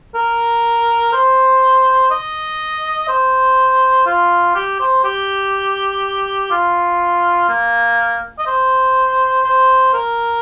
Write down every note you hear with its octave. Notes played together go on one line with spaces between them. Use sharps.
A#4
C5
D#5
C5
F4
G4
C5
G4
F4
A#3
D#5
C5
C5
A#4